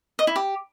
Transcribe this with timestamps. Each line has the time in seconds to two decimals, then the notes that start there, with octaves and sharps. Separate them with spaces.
0.19 D#5
0.27 E4
0.36 G4